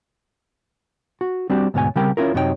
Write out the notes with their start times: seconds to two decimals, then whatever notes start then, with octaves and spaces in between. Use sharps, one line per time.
1.21 F#4
1.50 G3 C4 D4 F#4 G4
1.74 D2 G#2 B2 C#5 G#5
1.96 C#3 G3 C4 G4 A#4 G5
2.17 C#4 E4 F4 A#4
2.34 F#2 C3 F#3 D#4 G4 G5